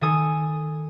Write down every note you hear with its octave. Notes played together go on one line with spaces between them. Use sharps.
D#3 A4 G#5 D#6